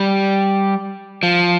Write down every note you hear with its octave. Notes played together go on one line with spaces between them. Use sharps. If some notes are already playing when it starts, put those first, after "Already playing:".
Already playing: G3
F3